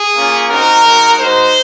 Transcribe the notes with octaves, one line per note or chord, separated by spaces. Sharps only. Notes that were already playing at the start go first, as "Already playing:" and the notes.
Already playing: G#4
A#3 C#4 F4
C4 D#4 F#4 A#4
G#3 D#4 F#4
G#3 D#4 F#4 C5